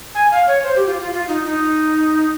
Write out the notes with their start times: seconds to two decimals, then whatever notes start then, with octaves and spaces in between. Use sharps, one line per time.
0.15 G#5
0.31 F5
0.47 C#5
0.63 C5
0.76 G4
0.87 F4
0.99 F4
1.13 F4
1.28 D#4
1.45 D#4